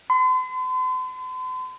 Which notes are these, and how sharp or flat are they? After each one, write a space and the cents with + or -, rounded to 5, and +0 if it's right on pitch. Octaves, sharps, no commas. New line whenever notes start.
C6 -45